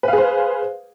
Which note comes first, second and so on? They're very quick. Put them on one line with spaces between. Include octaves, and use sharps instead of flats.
B4 F5 G#4 C5